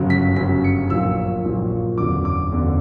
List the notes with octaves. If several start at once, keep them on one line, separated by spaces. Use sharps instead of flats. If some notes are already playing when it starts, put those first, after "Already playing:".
Already playing: G1 F#2 C#3 F#3
B6
G1 F#2 C#3 F#3 B6
C#7
A#1 A#2 F#3 E6
A#1 A#2 F#3
F#1 E2 D3 F#3 D6
D6
F#1 E2 D3 F#3